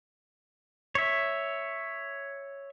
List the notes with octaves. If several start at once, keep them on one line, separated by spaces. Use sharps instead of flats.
C#5 E5